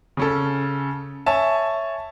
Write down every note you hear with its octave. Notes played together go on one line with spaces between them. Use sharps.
C#3 C#4 A4
C#5 E5 G#5 A5